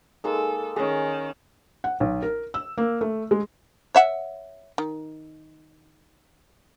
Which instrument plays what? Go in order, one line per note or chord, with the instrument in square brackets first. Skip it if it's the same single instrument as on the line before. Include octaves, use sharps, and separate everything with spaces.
[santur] G#3 A#3 D#4 [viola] A4
[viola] D#3 [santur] C#4 G#4
[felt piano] F#5
B1
A#4
E6
A#3
A3
G#3
[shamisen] C#5 E5 F#5
D#3